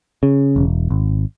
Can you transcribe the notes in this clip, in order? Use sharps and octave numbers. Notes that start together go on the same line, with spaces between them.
C#3
E1
G#1